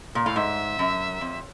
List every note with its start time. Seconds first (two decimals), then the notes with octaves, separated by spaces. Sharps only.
0.15 A#2
0.24 A2 F5
0.36 G#2 E5
0.79 F#2
1.21 F2